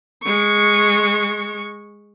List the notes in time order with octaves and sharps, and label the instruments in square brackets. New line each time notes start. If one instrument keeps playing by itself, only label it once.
[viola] G#3 C#6